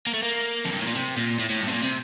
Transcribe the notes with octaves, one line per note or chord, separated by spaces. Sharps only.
A#3
A3
A#3
F2
G2
A2
A#2
C3
A#2
A2
A2
G2
C3
A#2
C3